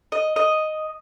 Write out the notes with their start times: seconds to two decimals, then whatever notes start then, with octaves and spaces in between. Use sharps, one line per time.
0.12 D#5
0.36 D#5